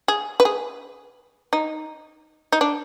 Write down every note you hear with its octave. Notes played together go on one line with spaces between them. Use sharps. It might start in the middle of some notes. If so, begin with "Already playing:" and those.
G#4
B4
G#4
D#4
D#4
D4